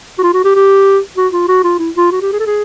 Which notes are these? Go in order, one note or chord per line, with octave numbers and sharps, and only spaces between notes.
F#4
F4
F#4
G4
G4
F#4
F4
F#4
F4
E4
F4
F#4
G4
G#4
A4
G#4